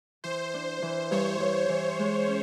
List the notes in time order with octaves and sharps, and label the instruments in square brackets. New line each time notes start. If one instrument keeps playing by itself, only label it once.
[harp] E3 [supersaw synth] C5
[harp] D4
E3
[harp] G2 [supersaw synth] C#5
[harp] G2
E3
G#3
C#4